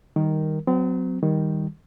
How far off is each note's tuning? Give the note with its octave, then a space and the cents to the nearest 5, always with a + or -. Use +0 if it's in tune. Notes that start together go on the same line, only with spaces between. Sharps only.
D#3 +0 G3 +0 A#4 +0
F#3 +0 C4 -40
D#3 +5 G3 +5